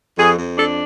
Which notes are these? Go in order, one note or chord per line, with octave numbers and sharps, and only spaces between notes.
F2 G#4
F2
D4 A4